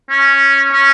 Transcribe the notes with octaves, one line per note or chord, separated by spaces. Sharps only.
C#4
C#4